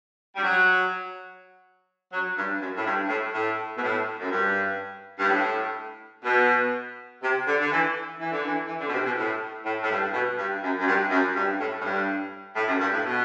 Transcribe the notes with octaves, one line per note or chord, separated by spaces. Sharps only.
G3
F#3
F#3
G2
F#2
A2
G2
A2
A2
B2
A2
F#2
G2
G2
A2
B2
C3
D3
D3
E3
E3
D3
E3
E3
D3
B2
C3
B2
A2
A2
A2
G2
B2
G2
F#2
F#2
G2
F#2
G2
A2
A2
G2
A2
F#2
G2
A2
B2